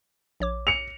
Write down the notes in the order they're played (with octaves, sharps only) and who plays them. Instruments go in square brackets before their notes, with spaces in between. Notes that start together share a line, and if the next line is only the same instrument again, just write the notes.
[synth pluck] A#1 C#5 D6
[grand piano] C#7 F7